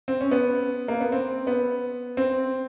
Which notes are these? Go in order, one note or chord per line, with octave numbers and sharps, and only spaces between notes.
C4
C#4
B3
A#3
B3
C4
B3
C4